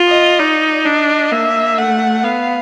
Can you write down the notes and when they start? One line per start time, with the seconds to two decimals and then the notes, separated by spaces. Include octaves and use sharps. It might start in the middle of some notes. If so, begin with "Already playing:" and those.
Already playing: F4
0.08 D#5
0.39 D#4 D5
0.85 D4 D#5
1.32 A#3 E5
1.78 A3 F#5
2.24 B3 F5